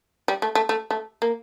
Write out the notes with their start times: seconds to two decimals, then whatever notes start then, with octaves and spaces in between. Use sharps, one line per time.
0.28 G3
0.42 A3
0.55 A3
0.69 A3
0.91 A3
1.22 A#3